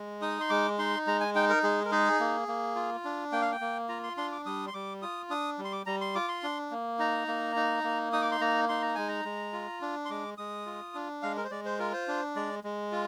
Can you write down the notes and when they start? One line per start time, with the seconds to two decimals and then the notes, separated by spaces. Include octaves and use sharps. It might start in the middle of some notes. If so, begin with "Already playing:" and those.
Already playing: G#3
0.22 D#4 D#6
0.40 C6
0.50 G#3 D6
0.79 D#4 C6
1.07 G#3 A#5
1.20 G#5
1.35 D#4 G5
1.49 A#4
1.63 G#3 G#4
1.85 A#4
1.91 D#4 G#4
2.20 A#3
2.48 A#3
2.76 F4
3.04 D4
3.32 A#3 G5
3.42 F5
3.52 G5
3.61 A#3
3.89 F4 A#5
4.03 C6
4.17 D4 C6
4.32 D6
4.46 G3 D#6
4.67 C6
4.74 G3 D6
5.02 F4 D#6
5.30 D4 D#6
5.58 G3
5.64 C6
5.72 D6
5.86 G3 A#5
6.01 C6
6.15 F4 D6
6.28 C6
6.43 D4
6.71 A#3
6.99 D#4 A#5
7.28 A#3
7.56 D#4
7.84 A#3
8.12 D#4 D#6
8.22 D6
8.31 C6
8.40 A#3 A#5
8.69 D#4 C6
8.82 A#5
8.95 G#3 G#5
9.08 A#5
9.25 G#3
9.53 F4
9.82 D4
10.05 C6
10.10 G#3 D6
10.38 G#3 D#6
10.66 F4
10.94 D4
11.22 G#3 F5
11.37 A#4
11.44 C5
11.51 G#3 D5
11.65 C5
11.79 F4 A#4
11.93 C5
12.08 D4
12.36 G#3 D5
12.64 G#3
12.92 F4